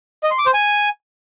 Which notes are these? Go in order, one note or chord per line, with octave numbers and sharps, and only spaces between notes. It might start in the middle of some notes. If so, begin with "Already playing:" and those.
D#5
C6
D6
C5
G#5